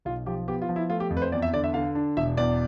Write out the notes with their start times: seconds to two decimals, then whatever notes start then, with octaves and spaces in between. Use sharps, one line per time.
0.05 B1 F4
0.26 F3 G4
0.48 B3 G4
0.62 F4
0.69 F3
0.76 E4
0.90 A3 F4
1.00 G4
1.10 F2
1.17 B4
1.22 C5
1.32 E2 D5
1.42 E5
1.53 D3 D5
1.64 E5
1.74 D3 F5
1.95 D4
2.17 E1 E5
2.37 E2 D5